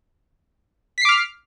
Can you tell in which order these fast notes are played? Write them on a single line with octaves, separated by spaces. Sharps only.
B6 C7 D6 F6